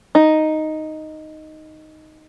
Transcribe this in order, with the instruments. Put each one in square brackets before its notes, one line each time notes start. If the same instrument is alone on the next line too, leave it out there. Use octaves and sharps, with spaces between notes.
[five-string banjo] D#4